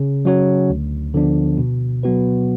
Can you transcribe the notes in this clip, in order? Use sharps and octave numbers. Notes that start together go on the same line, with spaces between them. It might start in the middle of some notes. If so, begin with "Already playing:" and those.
Already playing: C#3
F#3 C#4 F#4 C#5
D2
D3 F3 B3 D4
B2
F#3 B3 F#4 B4